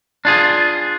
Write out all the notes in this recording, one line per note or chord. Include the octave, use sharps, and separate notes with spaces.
D4 F4 G#4